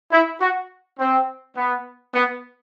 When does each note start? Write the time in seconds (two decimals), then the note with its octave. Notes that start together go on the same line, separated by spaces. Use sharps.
0.12 E4
0.40 F#4
0.99 C4
1.56 B3
2.14 B3